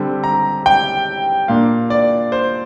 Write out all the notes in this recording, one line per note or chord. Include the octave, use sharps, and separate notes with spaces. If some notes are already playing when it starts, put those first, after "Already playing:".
Already playing: D3 G3 C4 G4
A#5
G5
A#2 A#3 D4 F5
D5
C5